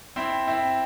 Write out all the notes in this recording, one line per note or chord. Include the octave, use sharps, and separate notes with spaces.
C4 E4
C4 E4